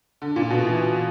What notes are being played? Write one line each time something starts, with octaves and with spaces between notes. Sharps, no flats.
D3
A#2
B2
E3